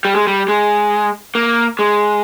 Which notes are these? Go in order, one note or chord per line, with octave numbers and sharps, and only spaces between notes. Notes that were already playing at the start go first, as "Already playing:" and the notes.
G3
G#3
G3
G#3
A#3
G#3